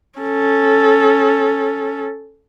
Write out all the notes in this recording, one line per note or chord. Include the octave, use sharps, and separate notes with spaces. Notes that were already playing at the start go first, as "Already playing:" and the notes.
C#4 A4